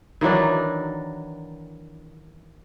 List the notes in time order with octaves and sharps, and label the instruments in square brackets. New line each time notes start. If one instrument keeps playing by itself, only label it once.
[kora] D#3 E3 F#3 D4